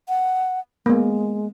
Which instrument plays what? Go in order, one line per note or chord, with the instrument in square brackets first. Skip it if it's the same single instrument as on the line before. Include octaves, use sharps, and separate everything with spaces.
[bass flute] F#5
[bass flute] G#3 [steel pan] A#3 B3